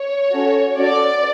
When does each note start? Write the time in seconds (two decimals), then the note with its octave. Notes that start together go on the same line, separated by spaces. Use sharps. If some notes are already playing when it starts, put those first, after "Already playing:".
Already playing: C#5
0.32 C#4 F#4 A4
0.78 C#4 F#4 A4 D5